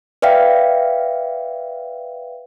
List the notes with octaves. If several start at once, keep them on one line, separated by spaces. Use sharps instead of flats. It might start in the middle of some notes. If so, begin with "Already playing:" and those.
B4 D5 E5 F5 G5